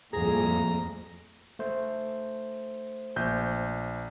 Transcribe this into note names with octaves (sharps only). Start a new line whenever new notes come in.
F2 A2 G3 A#3 G#4 A#5
A3 C5
A#1 G6